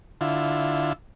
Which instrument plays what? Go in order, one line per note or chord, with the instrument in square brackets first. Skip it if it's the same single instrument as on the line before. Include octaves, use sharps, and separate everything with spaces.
[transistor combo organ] D3 E4 F4